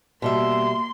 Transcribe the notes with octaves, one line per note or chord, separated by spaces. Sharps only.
B2 G3 A#3 E5 C6